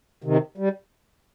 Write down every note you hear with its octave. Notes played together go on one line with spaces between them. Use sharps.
C3 D#3
G3